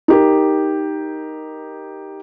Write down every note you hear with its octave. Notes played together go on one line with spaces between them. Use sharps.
D#4 G4 A#4